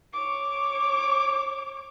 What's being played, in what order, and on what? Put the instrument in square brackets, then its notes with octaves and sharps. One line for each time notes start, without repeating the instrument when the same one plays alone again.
[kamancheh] C#5 D6